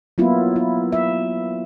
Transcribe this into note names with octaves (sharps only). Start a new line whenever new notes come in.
F#3 A#3 B3 E4 F4
E4
E5